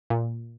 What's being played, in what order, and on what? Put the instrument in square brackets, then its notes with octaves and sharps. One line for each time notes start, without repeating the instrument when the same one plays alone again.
[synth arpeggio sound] A#2